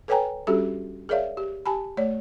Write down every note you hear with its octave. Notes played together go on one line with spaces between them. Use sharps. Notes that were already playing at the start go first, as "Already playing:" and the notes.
A4 B4 C#5 G5 G#5 A#5
G3 C#4 D4 F#4 G4 A4
G#4 A#4 C#5 D5 E5 F5
G4
G4 G#5 A5 B5
A3 C#5 D5